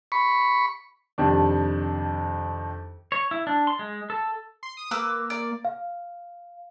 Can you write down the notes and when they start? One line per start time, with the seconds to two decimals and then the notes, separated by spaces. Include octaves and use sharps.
0.12 B5 C#6
1.18 F2 C3 D#3 D4
3.12 C#5
3.31 E4
3.47 D4
3.67 C6
3.79 G#3
4.10 A4
4.63 C6
4.77 D#6
4.91 A#3 B4 D6 E6
5.30 D5
5.65 F5